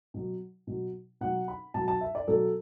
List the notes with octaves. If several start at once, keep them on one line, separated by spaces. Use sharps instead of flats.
B2 F#3
B2 F#3
B2 F#3 F#5
B5
B2 F#3 A5
A5
E5
D5
B2 F#3 A4